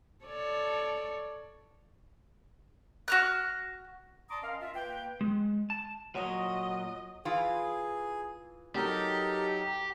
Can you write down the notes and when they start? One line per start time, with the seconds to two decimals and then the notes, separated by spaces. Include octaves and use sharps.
0.25 A4 C#5 D5
3.08 F#4 F6 F#6
4.30 D5 A5 A#5 C6 D6 D#6
4.42 C#4 A#4 D#5 F5
4.61 F4 E5
4.75 A#3 B4 G5
5.21 G#3
5.70 A5
6.15 A#2 F#3 F#4 C#5 D#5
7.25 E3 F4 G#4
8.76 F#3 D#4 G4 A4 A#4 D#5